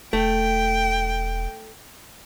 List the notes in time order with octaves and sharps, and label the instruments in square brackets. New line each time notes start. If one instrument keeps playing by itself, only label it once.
[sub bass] E1 [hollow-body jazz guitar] A3 [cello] G5